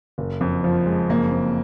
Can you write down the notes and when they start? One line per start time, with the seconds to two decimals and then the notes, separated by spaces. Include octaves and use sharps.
0.18 F#1
0.41 F2
0.64 F3
0.86 G#3
1.09 F#1 A#3
1.32 F2